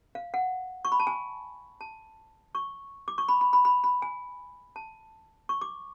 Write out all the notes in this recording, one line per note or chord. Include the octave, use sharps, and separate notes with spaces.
F5
F#5
C#6
B5
A5
G#5
A5
C#6
D6
C#6
B5
B5
B5
B5
B5
G#5
A5
C#6
D6